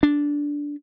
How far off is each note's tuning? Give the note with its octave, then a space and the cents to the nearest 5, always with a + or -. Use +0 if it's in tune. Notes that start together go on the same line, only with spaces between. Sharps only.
D4 -10